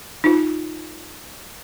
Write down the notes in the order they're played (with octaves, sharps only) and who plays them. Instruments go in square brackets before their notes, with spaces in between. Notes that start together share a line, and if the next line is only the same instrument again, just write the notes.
[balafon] D#4 F4